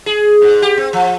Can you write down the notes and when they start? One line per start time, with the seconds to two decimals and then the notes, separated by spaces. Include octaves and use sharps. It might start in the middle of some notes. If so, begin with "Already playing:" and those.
0.06 G#4
0.42 G#2
0.62 G4
0.77 C4
0.93 F3